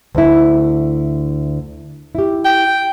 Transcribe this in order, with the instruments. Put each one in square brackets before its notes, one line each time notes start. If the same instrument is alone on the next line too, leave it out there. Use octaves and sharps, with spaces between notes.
[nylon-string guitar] D2 E4
E4 G4
[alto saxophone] G5